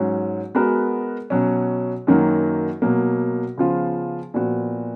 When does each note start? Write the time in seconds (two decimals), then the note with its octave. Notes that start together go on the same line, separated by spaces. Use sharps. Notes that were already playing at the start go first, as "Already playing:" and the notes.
Already playing: G#2 F#3 C#4
0.55 G#3 B3 F#4 A#4
1.30 B2 F#3 C#4
2.07 F#2 D#3 F#3 A#3
2.82 B2 F#3 A#3
3.58 C#3 F3 B3 F4
4.34 A#2 F3 B3 F#4